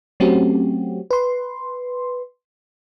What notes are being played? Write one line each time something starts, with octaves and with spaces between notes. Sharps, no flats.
F#3 A3 C4 C#4 F#4 G4
B4 C6